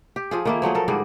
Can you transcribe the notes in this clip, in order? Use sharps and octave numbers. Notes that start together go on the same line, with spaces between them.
G4
F3 F4 G#4
D#3 A#3 E4
F3 F#3 A3 G#4
A4 A#4
G#2 D3 G3 G#4